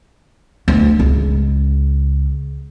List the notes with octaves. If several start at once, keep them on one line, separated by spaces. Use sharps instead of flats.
D2
C#2